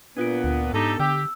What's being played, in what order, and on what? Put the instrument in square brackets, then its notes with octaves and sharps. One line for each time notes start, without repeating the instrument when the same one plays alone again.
[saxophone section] A#2 B3 [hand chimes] D4 F4 D7
[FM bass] D2
[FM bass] G#2 [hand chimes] B3 D4 [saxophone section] D#4 G4 A4
[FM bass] D3 [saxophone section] G4 [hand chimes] E6